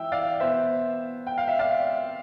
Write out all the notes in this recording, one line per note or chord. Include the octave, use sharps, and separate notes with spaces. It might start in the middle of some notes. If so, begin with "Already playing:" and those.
Already playing: E3 E5 G5 E6
D5 F5
B2 B3 C5 E5
G5
F5
E5
D5 F5